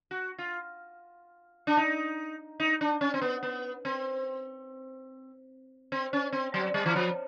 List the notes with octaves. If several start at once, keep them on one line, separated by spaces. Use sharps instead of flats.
F#4
F4
D4
D#4
D#4
D4
C#4
C4
B3
B3
C4
C4
C#4
C4
F#3
G3
E3
F3